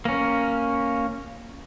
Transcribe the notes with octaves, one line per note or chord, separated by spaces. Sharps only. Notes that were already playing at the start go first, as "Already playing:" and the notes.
A#3 C#4